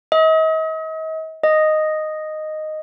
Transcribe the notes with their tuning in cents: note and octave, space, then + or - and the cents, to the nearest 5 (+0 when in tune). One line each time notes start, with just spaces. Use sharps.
D#5 +40
D#5 -5